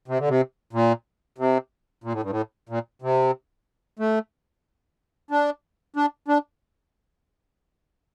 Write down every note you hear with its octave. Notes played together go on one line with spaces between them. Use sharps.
C3
D3
C3
A#2
C3
A#2
A2
G2
A2
A#2
C3
A3
D4
D4
D4